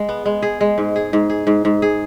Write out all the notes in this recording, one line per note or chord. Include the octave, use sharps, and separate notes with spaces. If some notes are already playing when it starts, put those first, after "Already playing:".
Already playing: G#3
B3
G#3
G#4
G#3
G#2
G#4
G#2
G#4
G#2
G#2
G#4